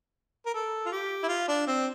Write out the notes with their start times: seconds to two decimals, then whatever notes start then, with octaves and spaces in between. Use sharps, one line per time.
0.46 A#4
0.54 A4
0.86 F4
0.92 G4
1.23 E4
1.28 F4
1.48 D4
1.67 C4